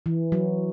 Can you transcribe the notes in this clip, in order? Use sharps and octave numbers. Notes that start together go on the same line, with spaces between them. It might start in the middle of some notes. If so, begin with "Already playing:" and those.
E3
F#3